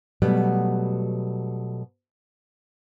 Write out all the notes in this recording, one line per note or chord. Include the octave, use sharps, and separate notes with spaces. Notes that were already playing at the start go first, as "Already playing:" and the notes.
B2 F#3 G3 A3 B3